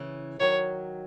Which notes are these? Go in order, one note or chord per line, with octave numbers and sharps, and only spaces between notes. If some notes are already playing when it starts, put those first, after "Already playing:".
Already playing: C#3 E3
D#3 F#3 C#5